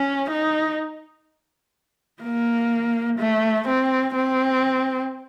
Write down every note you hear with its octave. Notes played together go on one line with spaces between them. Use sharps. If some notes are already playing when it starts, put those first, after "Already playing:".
Already playing: C#4
D#4
A#3
A3
C4
C4